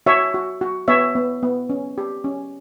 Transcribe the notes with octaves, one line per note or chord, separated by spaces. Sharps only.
F#4 C#5 E5
F#4
F#4
B3 C#5 E5
B3
B3
C#4
G4
C#4